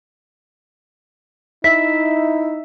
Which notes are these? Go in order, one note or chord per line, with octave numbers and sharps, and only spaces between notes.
D#4 E4 E5 B6